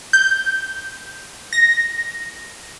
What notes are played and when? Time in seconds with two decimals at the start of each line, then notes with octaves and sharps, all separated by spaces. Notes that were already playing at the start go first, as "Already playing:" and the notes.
0.13 G6
1.53 A#6